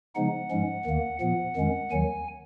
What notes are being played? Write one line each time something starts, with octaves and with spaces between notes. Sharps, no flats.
C#3 F3 G#3 B3 D#4 F#5
G#2 F3 G#3 C#4
D#2 D#3 A#3
A#2 F3 B3 F#5
F2 D#3 G#3 C#4
D#2 D#3 F#3 G#5